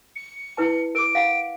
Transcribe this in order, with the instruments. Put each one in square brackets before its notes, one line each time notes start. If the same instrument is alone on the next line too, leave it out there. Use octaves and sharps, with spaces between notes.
[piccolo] C#7
[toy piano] E4 B4 A5
[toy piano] A#4 D6 [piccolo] D7
[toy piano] F5 F#5